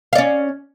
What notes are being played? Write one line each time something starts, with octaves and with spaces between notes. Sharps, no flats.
C#4 D5 F5